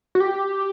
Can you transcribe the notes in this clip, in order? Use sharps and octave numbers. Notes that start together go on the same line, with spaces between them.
F#4
G4